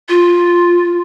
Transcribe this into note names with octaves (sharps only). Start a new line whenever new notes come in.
F4